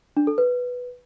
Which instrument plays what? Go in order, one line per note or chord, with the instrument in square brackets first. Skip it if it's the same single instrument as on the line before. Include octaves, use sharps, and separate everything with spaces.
[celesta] D4
A4
B4